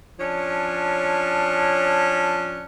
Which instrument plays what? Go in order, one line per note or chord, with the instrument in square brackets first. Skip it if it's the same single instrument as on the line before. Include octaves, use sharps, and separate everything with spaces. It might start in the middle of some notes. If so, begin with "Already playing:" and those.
[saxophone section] F3 C#4 D4 C#5